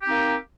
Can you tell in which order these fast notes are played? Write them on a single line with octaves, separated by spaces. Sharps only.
G4 C4 D#4 A#3